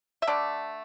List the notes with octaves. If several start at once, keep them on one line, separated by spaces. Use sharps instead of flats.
E5
D3 A3 D4 D5